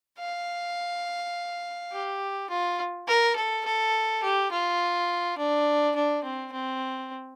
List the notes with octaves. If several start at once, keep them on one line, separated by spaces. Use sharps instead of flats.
F5
G4
F4
A#4
A4
A4
G4
F4
D4
D4
C4
C4